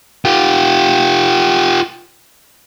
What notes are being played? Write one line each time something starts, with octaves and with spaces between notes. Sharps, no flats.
F4 G4